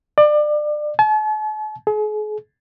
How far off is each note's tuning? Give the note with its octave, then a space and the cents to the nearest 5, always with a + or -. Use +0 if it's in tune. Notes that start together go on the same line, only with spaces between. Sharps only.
D5 +30
A5 -45
G#4 +40